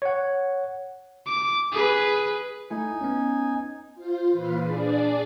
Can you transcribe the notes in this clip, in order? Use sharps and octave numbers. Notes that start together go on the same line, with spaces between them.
C#5 F#5
D6
G#4 B4
A3 D#4 E4 G#5
B3 C#4
F4 C5
A#2 E3 B4 F5
D4 G#4 D5